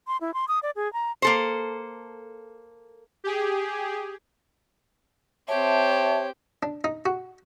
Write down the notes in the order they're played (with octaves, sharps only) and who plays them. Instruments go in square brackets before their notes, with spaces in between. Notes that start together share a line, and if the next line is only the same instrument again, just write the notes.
[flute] C6
E4
C6
D#6
D5
G#4
A#5
[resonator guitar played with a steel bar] A#3 A4 C5
[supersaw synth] G4 G#4
[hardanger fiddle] C4 G4 [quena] C#5 [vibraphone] E5 A5
[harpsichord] D4
D#4
F#4